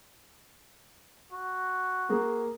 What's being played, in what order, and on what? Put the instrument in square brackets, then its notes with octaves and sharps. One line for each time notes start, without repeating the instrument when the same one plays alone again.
[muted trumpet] F#4
[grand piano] A#3 G#4 A#4